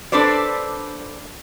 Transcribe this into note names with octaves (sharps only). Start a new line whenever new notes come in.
D4 A4 B4 C5 D5